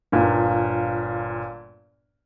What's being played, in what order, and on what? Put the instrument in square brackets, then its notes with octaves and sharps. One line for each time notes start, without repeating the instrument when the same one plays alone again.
[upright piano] G1 A#2